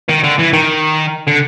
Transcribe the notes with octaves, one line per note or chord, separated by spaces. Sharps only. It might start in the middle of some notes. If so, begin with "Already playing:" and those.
D#3
D3
E3
D#3
D3